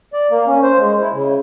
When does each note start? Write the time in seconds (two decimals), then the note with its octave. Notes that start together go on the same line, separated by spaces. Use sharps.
0.13 D5
0.30 A#3
0.47 C#4
0.63 C5
0.79 G#3
1.01 E4
1.12 C#3